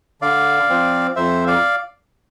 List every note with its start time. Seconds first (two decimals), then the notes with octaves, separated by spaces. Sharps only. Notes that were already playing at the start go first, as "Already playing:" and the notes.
0.21 D3 D5 F5
0.70 F3 C4
1.16 F2 C5 E5
1.47 D5 F5